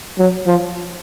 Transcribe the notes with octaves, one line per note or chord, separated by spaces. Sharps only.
F#3
F3